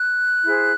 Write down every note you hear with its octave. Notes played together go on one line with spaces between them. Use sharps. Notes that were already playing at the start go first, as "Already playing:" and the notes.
Already playing: F#6
E4 G#4 C5